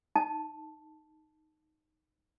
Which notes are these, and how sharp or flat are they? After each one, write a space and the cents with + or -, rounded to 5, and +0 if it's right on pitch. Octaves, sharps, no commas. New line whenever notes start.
D#4 +0 A5 +0